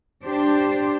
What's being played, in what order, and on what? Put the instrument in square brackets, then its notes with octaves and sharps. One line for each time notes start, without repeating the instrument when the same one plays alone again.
[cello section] D4 G4 C5